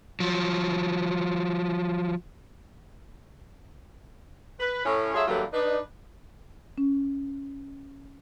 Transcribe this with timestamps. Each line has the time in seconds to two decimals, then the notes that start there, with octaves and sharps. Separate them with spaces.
0.20 F3 F#3
4.60 B4
4.85 A2 C#4
5.15 F#3 A3 F4 G#4 A4 E5
5.27 A2 D3 E3 F#3 G3 A#3
5.53 D4 D#4 B4
6.78 C#4